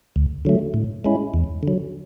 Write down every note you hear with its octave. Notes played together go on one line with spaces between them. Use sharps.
D2
D3 F#3 A3
A2
G#3 C#4 E4
E2
D3 F#3